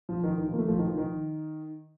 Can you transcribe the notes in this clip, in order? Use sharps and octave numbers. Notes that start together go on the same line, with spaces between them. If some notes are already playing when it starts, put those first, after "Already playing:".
F3
D#3
D#3
F3
A#3
A3
F3
D#3
F3
D#3